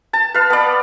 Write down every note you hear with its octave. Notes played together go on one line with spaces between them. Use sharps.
A5
B4 F5
B3 D5